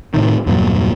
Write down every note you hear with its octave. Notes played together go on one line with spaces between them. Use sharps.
A2 C3 D#3
E2 G2 A#2 F#3